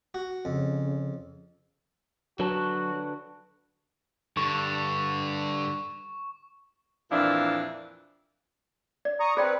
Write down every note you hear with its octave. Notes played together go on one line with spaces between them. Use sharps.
F#4
F2 C#3
D3 F#3 F#4 B4 A5
G2 D3 C#6
F2 A#2 E3 F3 D4 E4
D5
A#5 C#6 D#6
C4 G#4 B4 D5 G5